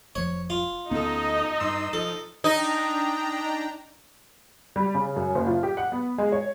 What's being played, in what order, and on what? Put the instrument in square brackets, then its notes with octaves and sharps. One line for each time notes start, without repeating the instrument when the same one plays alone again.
[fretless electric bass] F1 F3 [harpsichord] C#5
[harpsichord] F4
[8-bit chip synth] D2 A4 [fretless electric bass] B3 C#4 [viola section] D#4 D#5
[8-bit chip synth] G2 C6 E6
[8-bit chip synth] F3 [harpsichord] A4
[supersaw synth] D4 G5 A#5 [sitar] D#4
[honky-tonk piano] G3
C#3
F#2
F#1
F4
G4
F#5
B3
G#3
C#5